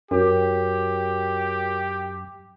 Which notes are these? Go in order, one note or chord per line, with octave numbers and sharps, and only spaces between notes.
F#2 F#4 G4 A#4 C#5